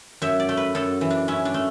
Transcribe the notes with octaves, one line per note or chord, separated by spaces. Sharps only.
F#2 E5
D5
A3
B4
F#2 A4
E3
D4
C#4 E4
D4
A3